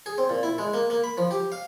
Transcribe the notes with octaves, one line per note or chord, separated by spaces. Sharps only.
G#4
C4
A#2
E4
G#3
A#3
A#3
B5
F3
G4
F5